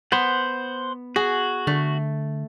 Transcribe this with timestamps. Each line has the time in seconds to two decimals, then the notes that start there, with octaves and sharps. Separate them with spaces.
0.12 B3 C5 F#5
1.16 F#4 G#4
1.67 D3 A3